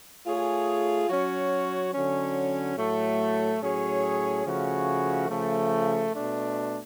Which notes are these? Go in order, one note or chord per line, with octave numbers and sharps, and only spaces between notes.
A3 F4 G#4 C#5
F#3 C#4 F#4 C#5
D3 F#3 C#4
A2 F#3 A3
A2 F#3 C#4 G#4 C#5
C#3 F3 A3 C#4 F#4
C#3 F3 A3
B2 A3 D4